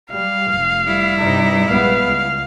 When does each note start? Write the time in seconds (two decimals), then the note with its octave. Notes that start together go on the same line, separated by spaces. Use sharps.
0.11 G3 F5
0.51 F1
0.85 G3 E4
1.19 G2 C3 D#4
1.70 A#1 G#3 B3 F5
2.05 C#2